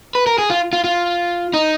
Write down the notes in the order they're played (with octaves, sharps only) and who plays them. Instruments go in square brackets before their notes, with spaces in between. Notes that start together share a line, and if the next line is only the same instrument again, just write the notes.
[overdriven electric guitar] B4
A#4
G#4
F4
F4
F4
D#4